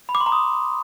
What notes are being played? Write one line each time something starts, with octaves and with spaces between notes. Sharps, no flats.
B5
D6
C6
A#5
D#6